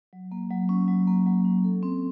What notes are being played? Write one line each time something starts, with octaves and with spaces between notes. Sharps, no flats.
F#3
A#3
F#3
C#4
F#3
A#3
F#3
C#4
A4
C4